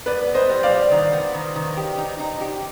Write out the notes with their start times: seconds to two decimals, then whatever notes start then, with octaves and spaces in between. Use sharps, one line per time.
0.06 B3 B4 D5
0.28 B3
0.34 C5 D#5
0.49 G3
0.63 D5 F5
0.70 G3
0.91 D#3
1.13 B3
1.34 D#3
1.56 D#3
1.77 G4
1.98 D#4
2.19 D#4
2.41 G4